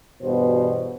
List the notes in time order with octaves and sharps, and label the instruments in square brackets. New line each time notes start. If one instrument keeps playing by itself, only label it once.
[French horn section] E2 G2 B2 F#4 C5